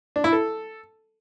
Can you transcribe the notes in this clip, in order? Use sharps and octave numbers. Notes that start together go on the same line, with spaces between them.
D4
E4
A4